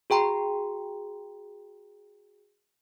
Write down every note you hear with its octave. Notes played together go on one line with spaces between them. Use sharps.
F#4 G#4 G5 A#5 C6